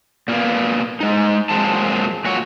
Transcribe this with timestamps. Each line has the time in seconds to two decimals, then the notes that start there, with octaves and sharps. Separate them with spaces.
0.28 A#2 A#3 B3
1.00 G#3 D#4
1.49 F2 A#2 F#3 G#3 C5 A5
2.25 A#2 F#4 C#5